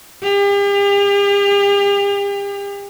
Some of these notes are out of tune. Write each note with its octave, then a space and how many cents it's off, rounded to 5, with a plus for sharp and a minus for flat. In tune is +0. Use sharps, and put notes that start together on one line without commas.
G4 +40